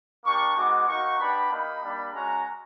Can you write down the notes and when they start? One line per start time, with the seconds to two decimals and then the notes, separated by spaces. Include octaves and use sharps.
0.25 A#3 D4 G4 C#6
0.56 G#3 B3 D#4 F#4 D6
0.87 A#3 D#4 F#4 C#6
1.19 B3 D4 G4 B5
1.51 A#3 D#4 G4 B5
1.82 G3 A#3 D4
2.13 G#3 C#4 F#4 A#5